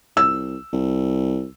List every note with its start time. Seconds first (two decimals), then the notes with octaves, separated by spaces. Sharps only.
0.17 C2 E6
0.73 C2